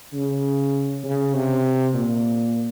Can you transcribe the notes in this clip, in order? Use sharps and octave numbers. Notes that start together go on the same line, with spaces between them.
C#3
C#3
C3
A#2